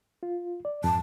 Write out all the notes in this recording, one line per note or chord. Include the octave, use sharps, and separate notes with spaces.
F4
D5
F2 G#2 A5